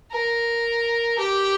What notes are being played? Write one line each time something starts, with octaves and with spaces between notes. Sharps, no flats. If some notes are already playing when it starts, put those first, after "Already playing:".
A#4
G4